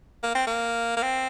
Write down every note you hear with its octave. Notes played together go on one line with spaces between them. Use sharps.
A#3
C4
A#3
A#3
C4